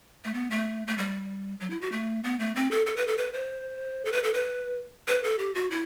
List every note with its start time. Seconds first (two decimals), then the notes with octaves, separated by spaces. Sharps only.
0.25 A3
0.34 B3
0.51 A3
0.88 A3
0.98 G3
1.60 F#3
1.70 E4
1.81 F#4
1.92 A3
2.24 B3
2.39 A3
2.56 C4
2.71 A4
2.86 A4
2.96 B4
3.07 A4
3.18 B4
3.33 C5
4.05 A4
4.12 B4
4.23 A4
4.34 B4
5.08 B4
5.24 A4
5.39 G4
5.55 F#4
5.70 E4